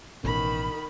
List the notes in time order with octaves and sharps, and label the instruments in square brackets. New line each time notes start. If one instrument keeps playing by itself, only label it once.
[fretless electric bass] A1 B2 [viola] D#3 B5